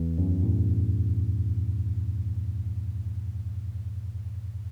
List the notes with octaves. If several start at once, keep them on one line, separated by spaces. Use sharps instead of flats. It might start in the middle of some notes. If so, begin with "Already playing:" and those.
Already playing: E2
F#2
A2